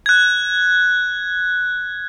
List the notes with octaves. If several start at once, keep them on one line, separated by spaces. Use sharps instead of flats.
F#6 G#6